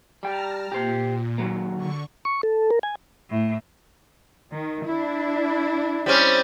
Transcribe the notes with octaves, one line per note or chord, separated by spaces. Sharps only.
G3 G5 A5 A#5 F6
A#2 G4 C5
D#2 F#3 A#3
D3 C#6
C#6
A4
A#4
G#5
A2
D#3
D4 E4
G3 C4 C#4